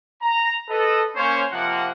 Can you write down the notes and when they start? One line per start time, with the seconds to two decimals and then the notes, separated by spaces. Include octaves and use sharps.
0.22 A#5
0.69 A4 B4 D#5
1.16 A#3 C#4 C5 C#5
1.51 C3 F3 A#3 F#5